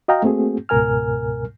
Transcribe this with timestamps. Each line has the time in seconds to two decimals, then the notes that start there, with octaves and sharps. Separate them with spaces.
0.08 F#4 D#5 F5 G5 A#5
0.23 A3 A#3 C4 F#4 G#4
0.69 C#2 G#2 B2 A#4 G#5 F6